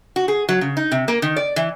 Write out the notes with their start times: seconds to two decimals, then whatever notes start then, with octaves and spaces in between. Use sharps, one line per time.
0.16 F#4
0.28 G#4
0.49 F#3
0.61 C#3
0.77 D#4
0.92 C3
1.08 A#3
1.22 D#3
1.36 D5
1.56 E3